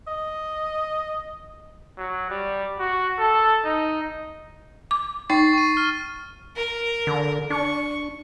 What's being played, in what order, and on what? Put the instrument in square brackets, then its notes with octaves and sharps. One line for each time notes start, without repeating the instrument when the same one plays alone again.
[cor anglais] D#5
[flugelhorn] F#3
G3
F#4
A4
D#4
[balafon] D6
[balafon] D#4 G5 [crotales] C#6 A6 C7
[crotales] C#6 D#7
F6
[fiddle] A#4
[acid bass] D3
[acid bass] D4 [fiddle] C#6